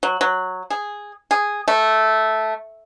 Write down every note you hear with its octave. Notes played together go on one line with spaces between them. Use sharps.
F#3
F#3
G#4
G#4
A3